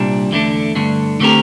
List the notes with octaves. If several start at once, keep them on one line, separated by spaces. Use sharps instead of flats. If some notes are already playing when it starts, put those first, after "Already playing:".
Already playing: C2 A#2 G3 D4
E2 D3 A3 D4
G2 D3 A3 D4
D3 A3 C4 G4 A#4